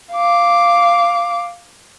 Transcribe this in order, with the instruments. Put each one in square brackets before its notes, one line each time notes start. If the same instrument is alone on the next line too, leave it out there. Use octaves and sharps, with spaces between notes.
[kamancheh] F5 D6